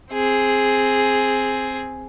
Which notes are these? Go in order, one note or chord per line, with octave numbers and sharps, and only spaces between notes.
C4 G#4